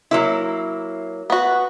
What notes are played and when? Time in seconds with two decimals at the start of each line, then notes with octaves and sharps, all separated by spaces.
0.11 F#3 A#3 E4
1.30 B3 F#4